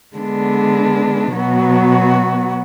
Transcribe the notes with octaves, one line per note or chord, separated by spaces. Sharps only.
D3 G#3 B3 D4
B2 F#3 B3 F#4